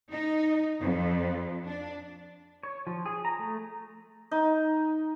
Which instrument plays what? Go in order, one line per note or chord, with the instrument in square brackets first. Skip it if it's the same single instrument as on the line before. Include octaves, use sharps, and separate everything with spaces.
[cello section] D#4
F2
D4
[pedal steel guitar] C#5
F3
G#4
A#5
A3
[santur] D#4